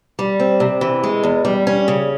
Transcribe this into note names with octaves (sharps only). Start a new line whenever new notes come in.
G3
C4
C3
E3
G#3
E2
G3
C#4
C#3